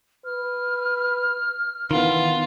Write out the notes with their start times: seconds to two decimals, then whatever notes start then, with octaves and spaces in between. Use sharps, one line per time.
0.25 B4 F6
1.91 D#3 E3 B3 F4